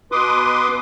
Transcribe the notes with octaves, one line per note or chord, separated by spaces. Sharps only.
B2 B4 C6 D6 D#6